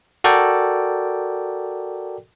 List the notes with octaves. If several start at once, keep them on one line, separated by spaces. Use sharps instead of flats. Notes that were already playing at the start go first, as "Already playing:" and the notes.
F#4 A4 A#4 D5 G5